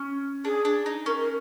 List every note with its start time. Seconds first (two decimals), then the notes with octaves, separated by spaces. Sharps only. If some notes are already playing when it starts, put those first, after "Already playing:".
Already playing: C#4
0.45 D4 G#4
0.65 D4
0.86 D#4
1.06 C#4 A#4
1.21 A#4